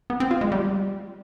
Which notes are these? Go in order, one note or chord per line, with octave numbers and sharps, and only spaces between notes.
B3
C4
F4
G#3
G3